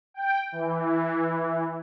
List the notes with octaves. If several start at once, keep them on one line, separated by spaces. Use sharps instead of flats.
G5
E3